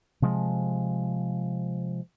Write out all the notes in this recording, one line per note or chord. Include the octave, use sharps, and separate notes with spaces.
C3 F3 G#3